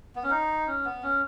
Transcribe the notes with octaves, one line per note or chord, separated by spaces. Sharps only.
B3
C#4
D#4
C#4
B3
C#4